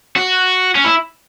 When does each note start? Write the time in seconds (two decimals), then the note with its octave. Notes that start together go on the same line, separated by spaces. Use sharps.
0.16 F#4
0.75 C#4
0.85 E4